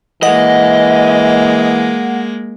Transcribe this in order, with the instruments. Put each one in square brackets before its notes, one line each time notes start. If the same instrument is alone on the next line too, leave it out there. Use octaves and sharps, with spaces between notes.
[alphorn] E3 [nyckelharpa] G#3 A#3 [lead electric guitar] D#5 [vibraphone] F#5